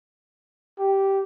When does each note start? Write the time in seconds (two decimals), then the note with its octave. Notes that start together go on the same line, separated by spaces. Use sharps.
0.79 G4